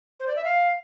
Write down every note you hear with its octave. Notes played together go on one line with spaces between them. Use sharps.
C5
D5
E5
F5